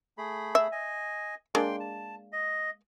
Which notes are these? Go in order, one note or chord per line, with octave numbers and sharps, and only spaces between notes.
A3 G#4 B5
E5
D#5 G#5
G#3 A#3 D4 G5 C6
A5
D#5